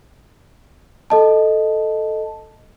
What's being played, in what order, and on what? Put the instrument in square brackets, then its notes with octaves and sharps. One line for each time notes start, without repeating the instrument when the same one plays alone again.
[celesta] A4 D#5 A5